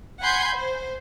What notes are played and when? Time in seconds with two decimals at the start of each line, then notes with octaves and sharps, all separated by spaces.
0.21 F#5 G#5 B5 C6 G6 G#6
0.56 C5